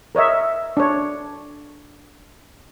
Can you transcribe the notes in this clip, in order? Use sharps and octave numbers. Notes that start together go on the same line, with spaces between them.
A#4 C#5 D#5 E5
D4 C#5